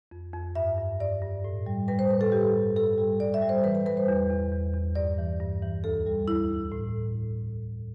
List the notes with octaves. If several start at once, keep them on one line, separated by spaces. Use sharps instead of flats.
F2
F2
G2 E5
G2
G2 D5
G2
A2
G3
G3 B4
C5
A2 B4
A4
G3 G4
G2
G2 A4
G3
G3 D5
E5
G3
C5
E3 B4
B4
G3 B4
C5
E2
E2
E2
E2
G2 D5
E3
G2
E3
D2 A4
G3
D2 E4
D2
A2